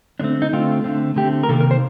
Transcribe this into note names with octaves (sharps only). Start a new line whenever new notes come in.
D3 A3 C4 D4
D#4
D3 A3 C4 F4
D3 A3 C4
D3 A3 C4 G4
A#4
C3 D#3 A#3 A4
A#4
C5